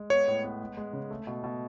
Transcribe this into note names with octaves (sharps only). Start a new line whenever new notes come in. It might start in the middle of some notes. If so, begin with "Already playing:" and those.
Already playing: G#3
B3 C#5
A2
B3
G#3
G#3
C#3
A3
B2
B2